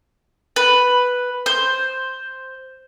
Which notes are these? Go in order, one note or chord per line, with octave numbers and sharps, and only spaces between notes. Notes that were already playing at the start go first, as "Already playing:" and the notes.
B4
C5